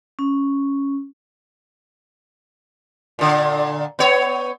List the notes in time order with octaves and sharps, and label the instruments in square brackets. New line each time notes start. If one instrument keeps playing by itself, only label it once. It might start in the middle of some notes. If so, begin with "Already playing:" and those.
[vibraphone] C#4
[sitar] A#2 D3
B3 C#5